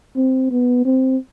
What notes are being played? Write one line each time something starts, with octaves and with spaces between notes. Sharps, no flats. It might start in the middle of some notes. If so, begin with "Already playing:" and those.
C4
B3
C4